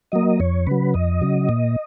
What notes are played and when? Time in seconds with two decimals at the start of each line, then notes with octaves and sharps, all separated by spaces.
0.12 F#3 A#3 D#5
0.40 F2 C#5
0.67 C#3 F#3 B4
0.94 F2 D#5
1.22 C#3 F#3
1.49 A#2